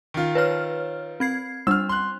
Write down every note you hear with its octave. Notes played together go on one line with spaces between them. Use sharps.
D#3 F4
B4 C#5 F6
C4 G#6 C7
G3 D4 E6 F6
C6 F#6